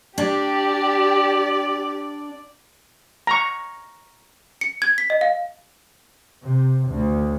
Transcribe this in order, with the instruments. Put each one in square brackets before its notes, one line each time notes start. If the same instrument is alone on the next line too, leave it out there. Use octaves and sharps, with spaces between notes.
[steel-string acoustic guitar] D4 [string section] G4 [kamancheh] D5
[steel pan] A#5 C#6
[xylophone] C#7
G#6
B6
D#5
F5
[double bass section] C3
D2